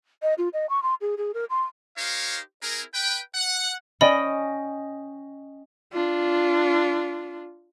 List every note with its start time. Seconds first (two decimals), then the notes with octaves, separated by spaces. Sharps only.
0.22 D#5
0.38 F4
0.53 D#5
0.70 C#6
0.83 C6
1.01 G#4
1.17 G#4
1.34 A#4
1.50 C6
1.98 D#4 G4 A#4 C5 C#5 F5
2.63 C4 E4 G#4 A#4
2.94 B4 G5
3.35 F#5
4.01 C#4 D5 D#5 G5 B5
5.93 D4 F4